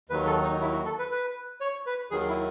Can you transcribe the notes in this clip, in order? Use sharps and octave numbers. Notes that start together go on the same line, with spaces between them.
D#2 D#3 F#3 B4
A4
D#4
E4
F#4
A4
B4
B4
C#5
B4
D#2 D#3 F#3 G#4
E4